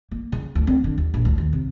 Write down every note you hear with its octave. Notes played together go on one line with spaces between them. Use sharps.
A#3
C#3
D2
C4
D3
D#2
A#1
D2
D#2
C3